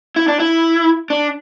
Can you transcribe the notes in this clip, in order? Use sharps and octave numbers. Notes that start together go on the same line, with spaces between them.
E4
D4
E4
D4